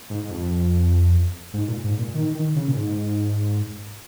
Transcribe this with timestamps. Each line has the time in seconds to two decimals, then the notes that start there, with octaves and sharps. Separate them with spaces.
0.10 G#2
0.24 G#2
0.31 F2
1.53 G#2
1.68 A#2
1.84 G#2
1.99 A#2
2.14 D#3
2.35 D#3
2.55 C#3
2.68 A#2
2.76 G#2